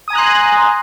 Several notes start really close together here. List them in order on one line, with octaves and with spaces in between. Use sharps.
D#6 G#5 A#5 F#6 C6